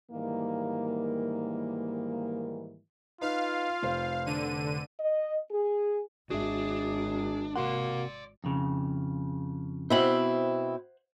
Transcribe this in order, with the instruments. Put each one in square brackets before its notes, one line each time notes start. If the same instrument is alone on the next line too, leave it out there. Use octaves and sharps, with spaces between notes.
[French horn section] G#2 D#3 E3 G3 A#3
[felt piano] D#4 B4 [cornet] F4 [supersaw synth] F5
[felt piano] F1 C5
[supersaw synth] D3 D#7
[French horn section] D#5
G#4
[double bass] G#1 [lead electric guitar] D4 [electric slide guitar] F#4 E5 [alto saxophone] G#4
[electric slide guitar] C3 F#4 F#5 [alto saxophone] A#3 [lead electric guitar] D5 C6
[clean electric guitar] F2 C#3
[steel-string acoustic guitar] B2 C4 E4 [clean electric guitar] C5 E5 F#5